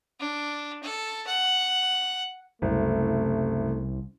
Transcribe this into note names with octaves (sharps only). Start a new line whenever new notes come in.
D4
A4
F#5
F#1 C2 A3